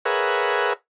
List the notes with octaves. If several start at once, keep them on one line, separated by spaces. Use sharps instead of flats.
G#4 A#4 B4 C#5 E5 F#5